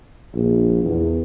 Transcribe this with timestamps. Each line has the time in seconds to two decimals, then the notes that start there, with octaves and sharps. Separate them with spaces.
0.35 A#1
0.83 E2